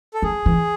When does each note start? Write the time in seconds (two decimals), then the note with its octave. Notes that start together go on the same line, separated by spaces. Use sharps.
0.14 A4
0.22 F#3 G#4
0.46 E3